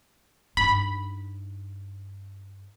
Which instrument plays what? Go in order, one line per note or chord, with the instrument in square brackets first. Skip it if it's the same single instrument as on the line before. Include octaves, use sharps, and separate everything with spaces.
[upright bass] G2 D#4 [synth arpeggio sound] B5